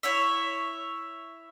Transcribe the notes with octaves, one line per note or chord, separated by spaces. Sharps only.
E4 C#5 E5